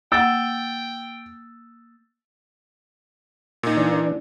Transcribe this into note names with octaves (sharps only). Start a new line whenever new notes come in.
A#3 F#5 G5 E6 A6
A#2 D#4
E3 D4